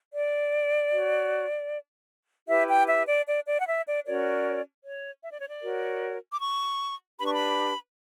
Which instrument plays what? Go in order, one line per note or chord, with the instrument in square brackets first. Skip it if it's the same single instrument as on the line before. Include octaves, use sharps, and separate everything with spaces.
[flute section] D5
F#4 C#5
E4 G4 B4 E5
G5
E5
D5
D5
D5
F#5
E5
D5
C#4 F#4 A#4 C#5 D5
C#5
E5
D5
C#5
D5
F#4 A#4 C#5
D6
C#6
D4 G4 B4 B5
C#6
B5